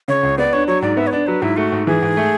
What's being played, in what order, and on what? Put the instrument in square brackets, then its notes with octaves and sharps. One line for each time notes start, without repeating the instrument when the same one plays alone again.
[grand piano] C#3 [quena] C#5
[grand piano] C#2
[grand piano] B3 [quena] D5
[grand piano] D4 [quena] C#5
[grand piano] F#3 [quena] C#5
[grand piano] G#2 [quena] D5
[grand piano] B3 [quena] E5
[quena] C#5
[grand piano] D4 [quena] D5
[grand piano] F#3 [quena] B4
[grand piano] G#2 [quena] E4
[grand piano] A3 [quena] F#4
[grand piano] G#2
[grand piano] E3 [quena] G#4
[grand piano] G#2
A3